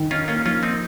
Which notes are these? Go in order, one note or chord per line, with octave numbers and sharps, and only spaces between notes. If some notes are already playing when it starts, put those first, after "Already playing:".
Already playing: D#3
C#4 D#4 F4
A#3 C#4 F4
F3 C#4 F4
C4 D#4